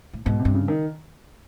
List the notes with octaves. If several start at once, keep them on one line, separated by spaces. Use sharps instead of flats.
A2
G#2 B2
C3
G2
C#3
D#3